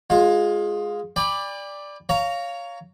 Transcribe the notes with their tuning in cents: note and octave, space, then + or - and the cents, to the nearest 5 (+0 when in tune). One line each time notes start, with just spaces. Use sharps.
G#3 +0 F4 +20 F5 +20
D5 +0 G5 +40 B5 +0
C#5 +15 F5 +0 A#5 -10